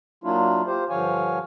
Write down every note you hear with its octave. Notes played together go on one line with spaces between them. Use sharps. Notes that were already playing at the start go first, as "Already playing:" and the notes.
F#3 A#3 D4 E4 F4
F4 G4 C5
G2 D3 F3 C#5 F5 G#5